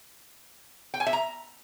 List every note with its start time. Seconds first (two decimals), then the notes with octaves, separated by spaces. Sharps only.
0.94 G5
1.00 G#5
1.07 E5
1.13 A#5